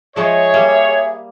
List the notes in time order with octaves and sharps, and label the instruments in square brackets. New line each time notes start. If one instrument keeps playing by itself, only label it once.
[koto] F3 G#3 D#4 [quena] G#4 [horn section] C#5 [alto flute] E5
[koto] G3 A#3